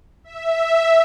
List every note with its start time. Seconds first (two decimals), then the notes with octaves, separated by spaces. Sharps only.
0.24 E5